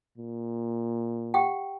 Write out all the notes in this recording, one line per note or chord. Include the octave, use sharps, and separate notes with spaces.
A#2
G4 F#5 G5